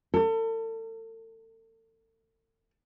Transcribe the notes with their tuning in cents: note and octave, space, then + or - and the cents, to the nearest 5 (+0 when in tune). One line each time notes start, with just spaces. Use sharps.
A4 +40